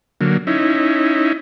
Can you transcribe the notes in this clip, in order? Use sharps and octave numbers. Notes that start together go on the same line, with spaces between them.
D3 F#3 A#3
C#4 D#4 E4